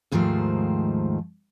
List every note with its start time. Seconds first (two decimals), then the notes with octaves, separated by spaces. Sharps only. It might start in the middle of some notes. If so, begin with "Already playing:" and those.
0.12 D#2 G#2 D#3 F3 A3 C5